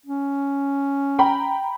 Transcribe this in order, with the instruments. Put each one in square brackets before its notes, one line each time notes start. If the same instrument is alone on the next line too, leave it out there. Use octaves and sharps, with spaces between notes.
[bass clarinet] C#4
[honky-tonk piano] G5 A#5 B5